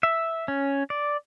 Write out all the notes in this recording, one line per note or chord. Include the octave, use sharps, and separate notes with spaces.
E5
C#4
D5